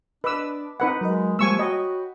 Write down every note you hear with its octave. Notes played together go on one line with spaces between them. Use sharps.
D4 B4 D#5 B5 D6 E6
C4 D#4 B4 F#5
F#3 G#3 A#4 D#5
F3 G3 G#3 A#3 G#5 C#6 E6
F#4 C#5 D#5 G5 B5